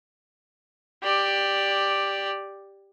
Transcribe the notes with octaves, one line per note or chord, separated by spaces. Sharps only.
G4 D5